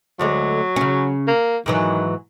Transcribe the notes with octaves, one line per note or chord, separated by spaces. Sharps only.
D2 D3 F#3 G#3
C#3 C#4
A#3
G#2 D#3 E3 F#3